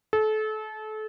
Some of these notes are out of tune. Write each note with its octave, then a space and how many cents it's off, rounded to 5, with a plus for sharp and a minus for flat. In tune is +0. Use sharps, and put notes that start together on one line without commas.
A4 -30